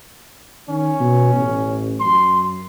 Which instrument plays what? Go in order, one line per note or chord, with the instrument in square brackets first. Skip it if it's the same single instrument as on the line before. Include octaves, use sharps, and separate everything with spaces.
[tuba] D#3 [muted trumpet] C#4
[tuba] B2
A1
[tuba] F#2 [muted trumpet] C6